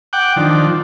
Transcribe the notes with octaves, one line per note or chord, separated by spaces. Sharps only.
F#5 G5 D6
D#3 F3 D4